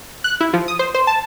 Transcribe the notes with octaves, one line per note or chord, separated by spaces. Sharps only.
F#6
E4
F3
D#6
C5
C5
A5